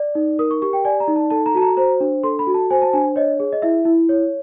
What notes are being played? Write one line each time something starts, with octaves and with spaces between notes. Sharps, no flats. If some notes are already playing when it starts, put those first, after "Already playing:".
Already playing: D5
D#4
A#4 D#6
C#6
G4 C#6
G5
D5 G#5
A#5
D#4
A5
A4 A5
A#5
F#4 A5
A#5
C5 A#5
D4
A4 C6
B5
F#4
A5
C5 G#5
A5
D4 G#5
C#5 D#5
G#4
D#5
E4 E5
E4
C#5